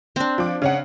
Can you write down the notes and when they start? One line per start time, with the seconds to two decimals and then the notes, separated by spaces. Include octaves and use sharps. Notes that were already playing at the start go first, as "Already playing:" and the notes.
0.16 C4 D4
0.38 F3 D6
0.62 C#3 C#4 F#5